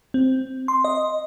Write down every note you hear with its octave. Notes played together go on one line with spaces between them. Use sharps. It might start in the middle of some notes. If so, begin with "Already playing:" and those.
C4
C6
D#5